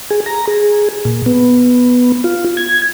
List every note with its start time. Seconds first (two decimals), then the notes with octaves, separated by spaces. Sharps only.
0.10 G#4
0.26 A#5
0.47 G#4
1.05 A#2
1.26 B3
2.24 F4
2.57 G#6